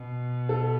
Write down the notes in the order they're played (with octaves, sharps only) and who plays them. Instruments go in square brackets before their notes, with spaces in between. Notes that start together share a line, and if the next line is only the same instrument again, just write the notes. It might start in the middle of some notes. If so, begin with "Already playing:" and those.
Already playing: [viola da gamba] B2
[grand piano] A4